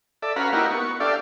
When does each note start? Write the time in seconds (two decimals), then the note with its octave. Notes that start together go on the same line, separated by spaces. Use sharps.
0.22 A4 D5 E5
0.36 C#4 F#4 B4 F5 A#5 B5
0.53 A#3 D#4 E4 F#4 G4 A#4
0.71 B3 C#6
1.00 D4 G4 A4 D5 E5 F5